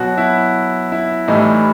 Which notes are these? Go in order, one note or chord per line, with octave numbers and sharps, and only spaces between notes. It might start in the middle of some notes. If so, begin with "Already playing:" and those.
Already playing: B2 F#3 F#4
E4
E4
A2 E3 G3 D#4